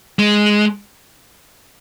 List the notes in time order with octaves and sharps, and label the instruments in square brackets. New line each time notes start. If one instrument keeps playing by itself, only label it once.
[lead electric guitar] G#3